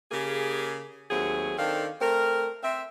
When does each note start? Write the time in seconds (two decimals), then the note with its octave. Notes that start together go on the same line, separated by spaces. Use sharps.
0.11 C#3 A#3 G4 G#4
1.10 D#2 F#3 A3 C4 G#4
1.57 D#3 C4 D4 A4 F5
2.01 A3 C4 A#4
2.63 C4 E5